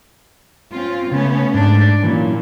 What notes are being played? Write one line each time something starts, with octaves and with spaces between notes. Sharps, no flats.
C4 C#4 F4
C#3 A3 B3 C#4
G#2 A3 D4 D5
A#2 E3 F#3 C#4